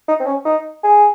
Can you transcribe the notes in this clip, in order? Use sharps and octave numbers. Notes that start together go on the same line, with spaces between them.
D#4
C4
C#4
D#4
G#4